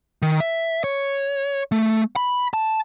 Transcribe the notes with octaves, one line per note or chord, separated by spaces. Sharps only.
D#3
E5
C#5
A3
B5
A5